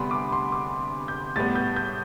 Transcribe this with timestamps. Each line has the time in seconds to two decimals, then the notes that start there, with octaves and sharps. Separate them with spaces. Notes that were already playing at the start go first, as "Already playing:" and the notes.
Already playing: D2 C3 G3 B3 B5 C6
0.11 D6
0.33 C6
0.52 D6
1.08 G6
1.36 A2 G3 B3 A6
1.55 G6
1.76 G6